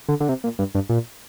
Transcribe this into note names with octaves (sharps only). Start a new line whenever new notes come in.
D3
D3
C3
A#2
G2
G2
A#2